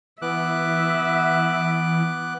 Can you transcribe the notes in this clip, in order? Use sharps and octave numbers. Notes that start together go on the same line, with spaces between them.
E3 B3 E5 D6 F#6